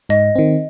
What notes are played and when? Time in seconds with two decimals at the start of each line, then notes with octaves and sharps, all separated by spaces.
0.09 G#2 D#5
0.35 D#3 C4